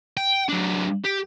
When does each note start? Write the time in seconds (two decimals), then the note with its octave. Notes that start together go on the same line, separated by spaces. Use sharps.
0.17 G5
0.49 F#3 D4
1.05 G4